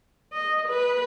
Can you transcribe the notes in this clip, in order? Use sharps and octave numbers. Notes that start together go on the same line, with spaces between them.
D#5
B4